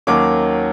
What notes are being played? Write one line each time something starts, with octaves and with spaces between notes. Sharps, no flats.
D#2 D#3 F#3 A#3 C#4 D6